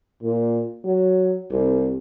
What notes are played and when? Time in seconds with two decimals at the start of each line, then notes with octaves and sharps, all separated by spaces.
0.22 A#2
0.84 F#3
1.51 C2